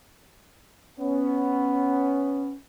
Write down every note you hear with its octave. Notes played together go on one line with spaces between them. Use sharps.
B3 C#4